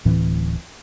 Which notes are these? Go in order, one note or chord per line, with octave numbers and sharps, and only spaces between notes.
D1 A2 E3 C4